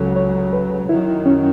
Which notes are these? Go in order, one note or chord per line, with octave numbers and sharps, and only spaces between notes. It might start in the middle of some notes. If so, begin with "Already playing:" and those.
Already playing: C#2 C#3 F#3 A4 C#5
C#5
B4
F#2 D#3 F#3 E4
C#4